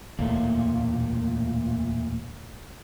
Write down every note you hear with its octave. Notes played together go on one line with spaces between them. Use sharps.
E1 D2 A#2 A3